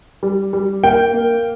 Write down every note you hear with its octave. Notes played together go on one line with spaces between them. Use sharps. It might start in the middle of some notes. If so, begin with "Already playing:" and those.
G3
G3
A#3 G5
A#3